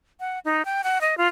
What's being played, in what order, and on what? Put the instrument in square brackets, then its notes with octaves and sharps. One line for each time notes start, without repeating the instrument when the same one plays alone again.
[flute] F#5
D#4
G5
F#5
D#5
F4